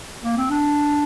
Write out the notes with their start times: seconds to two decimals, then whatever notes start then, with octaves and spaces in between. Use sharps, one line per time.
0.23 A#3
0.37 C4
0.50 D4